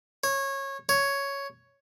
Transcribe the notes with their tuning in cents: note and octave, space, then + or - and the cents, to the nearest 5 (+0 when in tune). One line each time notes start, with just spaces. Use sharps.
C#5 -20
C#5 +5